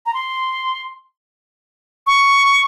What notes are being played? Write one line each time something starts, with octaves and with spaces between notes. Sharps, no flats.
A#5
C6
C#6